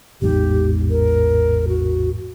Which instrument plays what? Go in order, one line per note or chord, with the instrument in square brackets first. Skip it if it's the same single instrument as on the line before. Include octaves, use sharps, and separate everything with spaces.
[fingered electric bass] A1 E2 G#2 [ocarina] G4
[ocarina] A#4
F#4